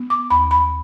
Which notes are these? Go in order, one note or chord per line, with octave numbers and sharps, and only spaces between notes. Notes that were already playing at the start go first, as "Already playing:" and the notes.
Already playing: B3
D6
D#2 B5
B5